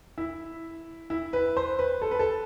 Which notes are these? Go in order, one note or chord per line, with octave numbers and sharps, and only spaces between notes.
E4
E4
B4
C5
B4
A4
B4
A4